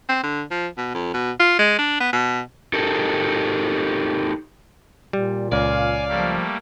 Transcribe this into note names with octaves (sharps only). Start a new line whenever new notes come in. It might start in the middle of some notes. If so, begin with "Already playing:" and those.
C4
D3
F3
B2
F2
B2
F4
G#3
D4
B3
B2
D#4 G4 A4 A#4
A#2 G3
C#2 D5 F5 G#5
F3 G3 A3 A#3